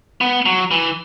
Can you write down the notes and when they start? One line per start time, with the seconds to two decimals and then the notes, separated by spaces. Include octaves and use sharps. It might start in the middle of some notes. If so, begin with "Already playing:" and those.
0.21 B3
0.46 F#3
0.71 E3